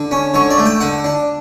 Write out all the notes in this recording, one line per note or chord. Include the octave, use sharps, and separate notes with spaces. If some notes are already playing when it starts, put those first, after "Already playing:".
Already playing: D3
C#4
D3 C#5
D5
A3
G5
D3 F#5
D4